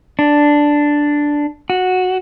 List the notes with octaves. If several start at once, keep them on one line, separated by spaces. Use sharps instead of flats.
D4
F#4